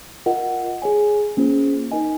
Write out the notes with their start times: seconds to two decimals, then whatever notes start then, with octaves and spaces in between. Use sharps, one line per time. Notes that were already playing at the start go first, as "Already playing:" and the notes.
0.26 F4 A#4 D#5 F#5
0.82 G#4 C#5 G#5
1.37 A#3 C#4 F4 G#4 C5
1.91 D#4 A#4 D#5 G#5